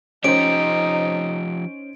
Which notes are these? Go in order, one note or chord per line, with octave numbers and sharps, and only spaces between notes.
F3 C#4 D#4 G4 C5 D7